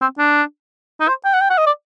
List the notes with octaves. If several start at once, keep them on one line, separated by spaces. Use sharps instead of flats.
C4
D4
D#4
C5
G5
F#5
G5
F#5
D#5
D5